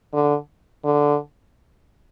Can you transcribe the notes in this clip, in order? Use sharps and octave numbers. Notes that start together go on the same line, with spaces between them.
D3
D3